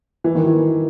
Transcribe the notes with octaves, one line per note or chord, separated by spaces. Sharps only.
E3
D#3
E3